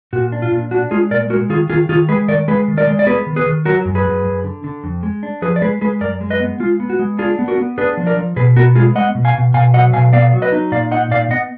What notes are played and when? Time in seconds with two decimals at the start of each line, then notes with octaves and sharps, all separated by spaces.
0.13 A#2 F#4
0.32 D4
0.42 F4
0.52 A#2
0.71 D4 F#4
0.91 G#3 F4 G#4
1.11 A#2 A#4 D5
1.30 G#3 F#4 A#4
1.50 D#3 F4 G#4
1.70 D#3 F4 G#4
1.89 D#3 F4 G#4
2.09 G#3 G#4 B4
2.28 D#3 A#4 D5
2.48 G#3 G#4 B4
2.68 D#3
2.77 A#4 D5
2.87 G#3
2.99 D5
3.07 B3 G#4 B4
3.27 D#3
3.36 G#4 B4
3.46 D#3
3.65 F#3 F#4 A#4
3.85 F#2
3.95 G#4 B4
4.05 F#2
4.25 F#2
4.44 D3
4.64 D3
4.83 F2
5.03 G#3
5.23 D4
5.42 F3 G#4 B4
5.56 D5
5.62 G#3 G#4 B4
5.81 G#3 G#4 B4
6.01 F#2 A#4 D5
6.21 G#3
6.30 B4 D#5
6.40 B3
6.60 G#3 F4
6.80 B3
6.90 F#4
6.99 G#3
7.19 D4 F4 G#4
7.39 B3
7.48 F#4 A#4
7.58 B3
7.78 D4 G#4 B4
7.97 F3
8.07 A#4 D5
8.17 F3
8.36 B2 G#4 B4
8.56 B3 F#4 A#4
8.75 G#3 F4 G#4
8.95 G#3 D#5 F#5
9.15 B2
9.25 F5 G#5
9.35 B2
9.54 B2 F5 G#5
9.74 F#3 D#5 F#5
9.93 B2 F5 G#5
10.13 B3 D5 F5
10.33 F#3
10.42 B4 D#5
10.52 D#4
10.72 A#2 D5 F5
10.91 D#4 D#5 F#5
11.11 A#2 D5 F5
11.31 B3 D#5 F#5